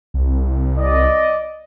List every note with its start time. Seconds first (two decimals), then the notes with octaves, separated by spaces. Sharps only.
0.14 C2
0.78 D5 D#5